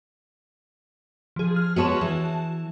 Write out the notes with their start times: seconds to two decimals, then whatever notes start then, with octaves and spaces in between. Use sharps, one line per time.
1.36 F3 G#4
1.56 F6
1.76 G#3 B3 F#4 C#5 A5 E7
2.01 E3